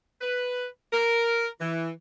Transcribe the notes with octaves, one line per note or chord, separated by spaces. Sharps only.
B4
A#4
E3